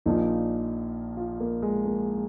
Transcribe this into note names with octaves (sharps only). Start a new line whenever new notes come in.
A#1 A#2 F3 D#4
F4
A#3
G#3
A#3